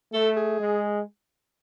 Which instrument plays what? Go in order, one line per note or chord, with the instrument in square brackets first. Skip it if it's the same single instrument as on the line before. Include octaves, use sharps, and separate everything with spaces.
[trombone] A3 [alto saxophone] A4
[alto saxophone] G#4
[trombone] G#3